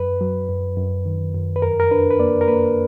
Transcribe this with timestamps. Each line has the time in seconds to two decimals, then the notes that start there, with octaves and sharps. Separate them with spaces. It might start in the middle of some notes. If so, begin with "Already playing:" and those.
Already playing: F#2 B4
0.21 F#3
0.49 F#2
0.77 F#2
1.06 D#3
1.35 F#2
1.56 B4
1.62 F2 A#4
1.80 A#4
1.91 D4 B4
2.11 B4
2.20 A#3 D5
2.41 A#4
2.48 A#3 B4